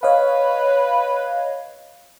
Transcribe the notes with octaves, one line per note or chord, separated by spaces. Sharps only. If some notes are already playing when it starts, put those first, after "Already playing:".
B4 C#5 D#5 F5